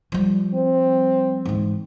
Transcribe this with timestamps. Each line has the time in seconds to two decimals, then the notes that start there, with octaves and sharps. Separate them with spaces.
0.12 F3 G3
0.54 C4
1.46 G#2 E3